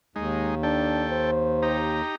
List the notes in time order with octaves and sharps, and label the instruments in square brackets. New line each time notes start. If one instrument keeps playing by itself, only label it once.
[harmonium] D#2 [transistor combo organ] G#3 D#4
[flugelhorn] D4 [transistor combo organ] A4 G5
[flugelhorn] C5
[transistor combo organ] D#4 G4 A#5